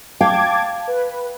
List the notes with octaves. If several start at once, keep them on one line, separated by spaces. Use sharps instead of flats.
F5 G5 A5 D6 G#6
B4